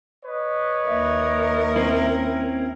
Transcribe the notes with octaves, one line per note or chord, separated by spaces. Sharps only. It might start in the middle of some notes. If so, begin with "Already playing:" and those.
B4 C#5 D#5
D#2 A#4 E5
C4 C#4 E4